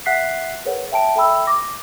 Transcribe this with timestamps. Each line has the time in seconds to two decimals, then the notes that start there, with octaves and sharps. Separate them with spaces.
0.06 E5 F#5 F#6 B6 C7
0.65 G#4 A#4 B4 C#5 F#5
0.92 E5 G5 A5 D7
1.16 A4 E5 G5 B5 E6
1.47 D6 A#6